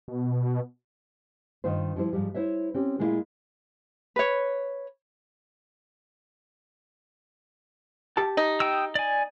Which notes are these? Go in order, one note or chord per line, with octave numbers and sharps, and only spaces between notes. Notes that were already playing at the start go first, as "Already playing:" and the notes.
B2
G2 D#3 D#4 F4 C5
F3 G3 E4 C5
G#2 F3 G3
E4 C5 C#5 E5
C4 C#4 G4
A#2 G#3 A#3 B3 E4 F4
B4 C#5
G4 A5
D#4
G5 D#6 E6
D5 G#5